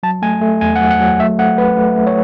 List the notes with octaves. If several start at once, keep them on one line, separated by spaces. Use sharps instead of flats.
F#3 A5
A3 G#5
A3
E2 G#5
F#5
F#3
F#5
F#3
A3 E5
A3 F#5
A3 B4
A3
A3
C#5